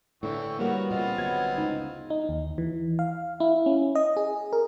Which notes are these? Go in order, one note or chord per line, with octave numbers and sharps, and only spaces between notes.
A2 D3 E3 G5 C#6
G3 A#3 B3 F#4 A#4 C#5
A#2 C#3 C4 F4 D#5
G1 F#3 G#6
C#2 D#4
D#4
D#2
E3
F5
E4
C#4
D#5
G#4
A#4